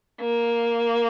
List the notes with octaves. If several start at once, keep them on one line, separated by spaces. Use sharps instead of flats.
A#3